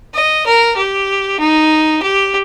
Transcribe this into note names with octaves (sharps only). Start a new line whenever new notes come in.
D#5
A#4
G4
D#4
G4